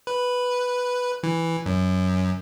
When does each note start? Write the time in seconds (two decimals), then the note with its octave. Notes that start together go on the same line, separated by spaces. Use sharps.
0.07 B4
1.23 E3
1.66 F#2